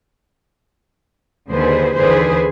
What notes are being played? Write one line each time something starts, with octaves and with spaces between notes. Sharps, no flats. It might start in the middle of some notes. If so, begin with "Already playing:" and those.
D#2 D3 G#4 B4 C5
D#2 D3 E3 G#4 B4 C5